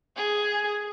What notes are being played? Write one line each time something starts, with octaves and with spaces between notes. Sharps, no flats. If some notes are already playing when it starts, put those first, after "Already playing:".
G#4